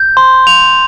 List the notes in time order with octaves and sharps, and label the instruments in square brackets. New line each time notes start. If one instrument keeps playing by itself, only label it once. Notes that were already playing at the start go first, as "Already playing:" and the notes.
Already playing: [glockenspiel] G6
C6
F7